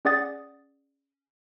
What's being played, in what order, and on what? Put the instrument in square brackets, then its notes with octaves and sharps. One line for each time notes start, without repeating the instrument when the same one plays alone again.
[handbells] C#4 G#4 D5 F#5 D#6 A6